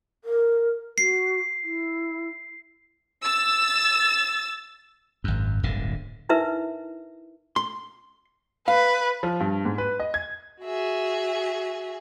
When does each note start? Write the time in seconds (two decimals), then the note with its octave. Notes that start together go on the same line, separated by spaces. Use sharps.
0.24 A#4
0.98 F#4 C7
1.63 E4
3.23 E6 A6
5.24 G#1 F#2
5.63 D1 G1 A#2 D3
6.29 D#4 E4 A#4 B4 E5
7.56 C6
8.68 B4 F5
9.23 F3
9.40 G2
9.65 G#2
9.78 B4
10.00 D#5
10.14 G#6
10.61 F#4 G#4 E5